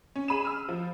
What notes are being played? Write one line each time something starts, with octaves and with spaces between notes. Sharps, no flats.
C#4
G#4 B5 D#7 E7
E6 F6
F3